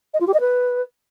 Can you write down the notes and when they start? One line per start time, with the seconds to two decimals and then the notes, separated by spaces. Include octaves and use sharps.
0.14 D#5
0.20 F4
0.27 G4
0.34 D#5
0.40 B4